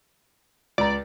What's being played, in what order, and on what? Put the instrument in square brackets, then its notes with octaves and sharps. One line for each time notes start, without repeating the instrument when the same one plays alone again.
[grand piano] C#2 A#5 [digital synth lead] D5